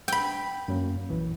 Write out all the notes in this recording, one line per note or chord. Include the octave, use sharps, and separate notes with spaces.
G5 B5
F#2 F#3 A#3
A#1 E3